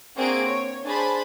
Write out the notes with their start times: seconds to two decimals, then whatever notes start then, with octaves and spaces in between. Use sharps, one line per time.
0.16 A#3 C4 D4 F#4 G#4 D7
0.47 C#5
0.85 D4 G#4 C5 A5 B5